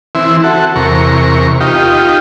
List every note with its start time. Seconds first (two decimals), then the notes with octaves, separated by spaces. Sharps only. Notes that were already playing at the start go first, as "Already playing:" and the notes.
0.15 E3 C4 E4
0.44 F#4 A4
0.76 E2 C3 A#4 C#6
1.60 D#4 F4 G4